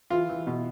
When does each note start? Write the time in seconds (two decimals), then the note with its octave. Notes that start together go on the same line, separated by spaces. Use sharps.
0.10 E3 F4
0.29 E3
0.47 B2